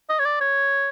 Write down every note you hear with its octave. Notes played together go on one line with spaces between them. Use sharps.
D#5
C#5
D5
C#5